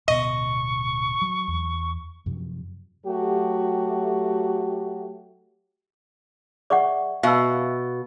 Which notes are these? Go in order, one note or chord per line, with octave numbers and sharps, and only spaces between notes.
D1 B2 B3 D#5 C#6
F#3
E2
F#2 C3 F3
F#3 A3 F#4 G4
G#4 D5 E5 F#5 C#6 D6
B2 B4 E5 F5 E6